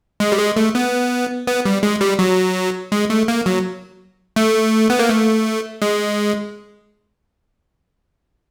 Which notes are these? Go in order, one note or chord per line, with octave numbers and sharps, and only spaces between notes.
G#3
G3
G#3
A3
B3
B3
G3
G#3
G3
F#3
G#3
A3
A#3
F#3
A3
B3
A#3
A3
G#3